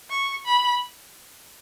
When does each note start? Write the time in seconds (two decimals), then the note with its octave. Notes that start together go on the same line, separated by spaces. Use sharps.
0.10 C#6
0.46 B5